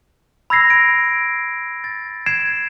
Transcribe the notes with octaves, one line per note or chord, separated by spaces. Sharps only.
B5 E6 G#6 A#6 C7
D7
A6
G#6 C7 D7 E7